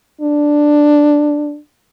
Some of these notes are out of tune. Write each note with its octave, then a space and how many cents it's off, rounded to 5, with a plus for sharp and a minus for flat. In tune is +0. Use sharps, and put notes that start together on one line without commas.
D4 +5